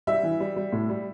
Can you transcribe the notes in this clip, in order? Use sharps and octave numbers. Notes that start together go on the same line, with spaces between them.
G3 E5
E3
G3
G3
A2
G3